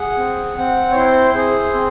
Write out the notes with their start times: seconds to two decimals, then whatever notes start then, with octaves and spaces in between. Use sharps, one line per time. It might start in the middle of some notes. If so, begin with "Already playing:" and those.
Already playing: G#4 F#5
0.18 C4
0.57 C4 F#5
0.91 C#5
0.96 E4 C5
1.34 G#4 C5
1.73 C4